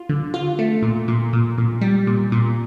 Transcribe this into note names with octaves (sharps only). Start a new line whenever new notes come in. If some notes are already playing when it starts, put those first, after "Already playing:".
Already playing: F4
D3
F4
A3
A#2
A#2
A#2
A#2
G3
A#2
A#2